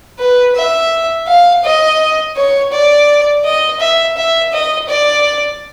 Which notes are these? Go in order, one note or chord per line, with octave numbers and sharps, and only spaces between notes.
B4
E5
F5
D#5
C#5
D5
D#5
E5
E5
D#5
D5